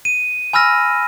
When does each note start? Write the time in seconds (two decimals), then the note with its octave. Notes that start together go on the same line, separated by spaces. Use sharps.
0.05 D#7
0.53 G#5 B5 E6 F6 A#6